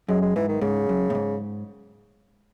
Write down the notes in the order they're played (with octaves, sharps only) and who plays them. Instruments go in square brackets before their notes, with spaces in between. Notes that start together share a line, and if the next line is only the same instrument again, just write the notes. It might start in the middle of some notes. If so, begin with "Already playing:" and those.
[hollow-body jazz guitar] F#2 [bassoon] G#3
[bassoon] G#3
[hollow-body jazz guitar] G#2 [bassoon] E3
[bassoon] D#3
[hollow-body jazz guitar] G#2 [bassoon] C#3
[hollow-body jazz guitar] F#2
A2
G#2